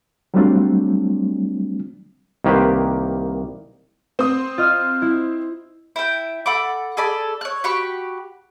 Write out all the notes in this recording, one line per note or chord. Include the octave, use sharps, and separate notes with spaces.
F#3 G3 A3 C4 D4 F4
C2 D#3 A#3 G4 B4 C5
C4 D#6
F4 D#5 F6
E4
E4 G5
A4 F#5 B5 D6
G#4 A4 D5 B5
C#5 F#6
F#4 G4 B5 C#6